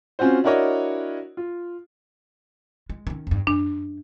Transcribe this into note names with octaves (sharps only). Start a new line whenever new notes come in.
C4 C#4 F4 F#4 C5
D4 E4 F#4 A#4 C#5 D#5
F4
G#3
D#3 C#4
E2 G2
F#2 D4